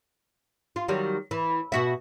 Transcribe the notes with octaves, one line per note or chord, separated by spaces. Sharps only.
F4
D#3 F#3 G3
E3
B2 F#4 E5